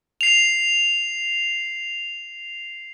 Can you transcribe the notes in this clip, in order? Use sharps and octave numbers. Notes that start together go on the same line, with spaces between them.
C7 F7